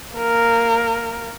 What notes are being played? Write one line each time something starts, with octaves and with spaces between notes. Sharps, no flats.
A#3 A#4